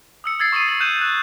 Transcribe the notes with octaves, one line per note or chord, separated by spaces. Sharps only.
D#6 E6 C#7
E6 G#6 A6 C7
C#6 D#6 E6 C7 D#7
A6 C7 F#7
F#6 G6 D#7 E7
F#6